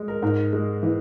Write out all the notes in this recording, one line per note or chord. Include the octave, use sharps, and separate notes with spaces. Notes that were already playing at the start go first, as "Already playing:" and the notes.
Already playing: G#3
A#4
G#2 A#4
G#3
E3